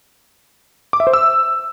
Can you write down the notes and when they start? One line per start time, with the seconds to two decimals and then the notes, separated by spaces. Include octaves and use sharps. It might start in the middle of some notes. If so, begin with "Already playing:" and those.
0.93 D6
1.00 E5
1.07 C5
1.13 E6